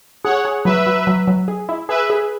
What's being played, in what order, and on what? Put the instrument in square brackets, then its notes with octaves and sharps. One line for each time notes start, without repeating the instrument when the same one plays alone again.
[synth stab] G#4 [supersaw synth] C#5 F#5
[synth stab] G#4
[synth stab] F#3 [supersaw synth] B4 E5
[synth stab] F#3
F#3
F#3
G#4
E4
[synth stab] G#4 [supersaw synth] B4 E5
[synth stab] G#4